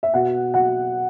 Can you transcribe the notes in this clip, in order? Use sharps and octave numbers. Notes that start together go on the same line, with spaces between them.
E5
B2 F#5
F#3 F#5